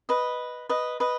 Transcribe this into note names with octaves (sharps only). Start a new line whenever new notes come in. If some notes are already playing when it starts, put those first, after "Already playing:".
B4 D#5
B4 D#5
B4 D#5